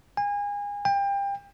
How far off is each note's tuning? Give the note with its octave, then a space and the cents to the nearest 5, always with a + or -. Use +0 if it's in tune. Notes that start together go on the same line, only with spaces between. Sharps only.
G#5 -30
G5 +30